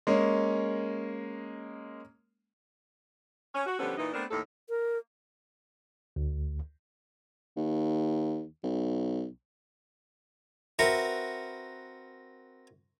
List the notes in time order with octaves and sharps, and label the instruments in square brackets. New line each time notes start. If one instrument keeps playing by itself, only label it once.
[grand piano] G#3 A#3 C#4
[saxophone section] C#4
F#4
D3 F3 G3 B3 C#4 A4
A#2 E3 D#4
A3 B3 C4 D4 A#4
D#2 A2 A4
[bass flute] A#4
[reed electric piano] D2
[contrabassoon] D#2
B1
[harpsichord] C4 F#4 A#4 B4 E5 F#5